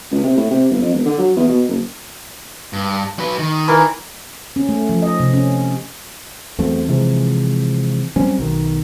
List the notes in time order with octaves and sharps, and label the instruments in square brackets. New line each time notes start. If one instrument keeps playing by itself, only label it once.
[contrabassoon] C#2
C3
A2
C3
G1
F2
E1
D3
F#3
E2
B2
F#1
[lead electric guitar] G2
F#3 B4
D#3
[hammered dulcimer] E3 A#4
[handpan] C#4
A3
F3
D#5
C3
C#4
[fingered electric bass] E2 F#3 A3 C4
C3 E3 F3 G#3
F#3 G3 C4 C#4
B1 D#3